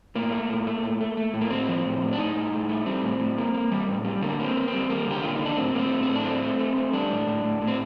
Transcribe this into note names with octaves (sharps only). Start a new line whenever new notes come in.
A2 A#3
A3
A2
A3
A2
A3
A3
A2
A#3
A2 C4
F3
A2
A2
D4
A2 D#4
A2
A2
A3
G3 C4
A2
A2
A#3
A#3
G3
A2
G3
D3 A#3
A#3 C4
A#3
C4
G3
G3 A#3
D3 G4
D3 F4
D#4
D3
D4
A2 C4
A2 A#3
C4
A3
C4
A2
D4
A3 C4
A3
A3
A3
G3 D4
A2
A2
A2
A2
C4